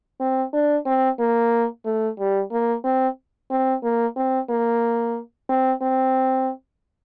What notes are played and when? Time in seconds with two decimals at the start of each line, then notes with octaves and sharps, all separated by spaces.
0.20 C4
0.53 D4
0.86 C4
1.20 A#3
1.85 A3
2.19 G3
2.52 A#3
2.84 C4
3.51 C4
3.83 A#3
4.16 C4
4.50 A#3
5.49 C4
5.82 C4